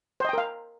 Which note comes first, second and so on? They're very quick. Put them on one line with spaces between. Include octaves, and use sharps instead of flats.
C5 D#5 G5 A#4 F5